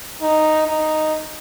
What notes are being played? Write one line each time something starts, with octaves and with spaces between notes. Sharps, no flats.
D#4
D#4